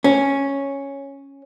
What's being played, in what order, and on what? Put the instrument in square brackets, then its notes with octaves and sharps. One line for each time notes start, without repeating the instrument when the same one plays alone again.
[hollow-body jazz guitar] C#4